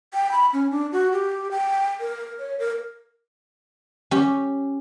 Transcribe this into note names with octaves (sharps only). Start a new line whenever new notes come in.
G5
B5
C#4
D4
F#4
G4
G5
A#4
C#5
A#4
C#4 G4